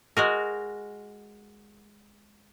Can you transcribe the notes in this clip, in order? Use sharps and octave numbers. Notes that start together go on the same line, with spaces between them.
G#3 F#4 A#4